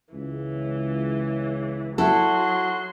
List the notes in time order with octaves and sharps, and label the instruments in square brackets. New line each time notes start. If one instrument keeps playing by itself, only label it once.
[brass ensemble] C#2 [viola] E3
[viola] F#3 C6 [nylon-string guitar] E4 A4 [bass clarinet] F#4